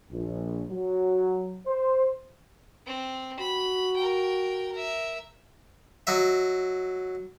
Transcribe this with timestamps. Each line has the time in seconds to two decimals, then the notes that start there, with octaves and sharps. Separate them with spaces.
0.11 A#1
0.70 F#3
1.67 C5
2.86 C4
3.39 F#4 B5
3.97 A#4 G5
4.72 A#4 E5
6.07 F#3 D#5 E5